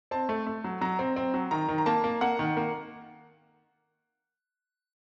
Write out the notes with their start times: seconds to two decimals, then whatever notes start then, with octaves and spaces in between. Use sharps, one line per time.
0.11 C4 A5
0.29 A3
0.47 A3
0.64 F#3
0.81 F#3 A#5
0.99 C4
1.16 C4
1.34 F#3
1.51 D#3 A#5
1.68 D#3
1.78 A#5
1.86 A#3 A5
2.04 A#3
2.21 A#3 F#5
2.39 D#3
2.57 A#3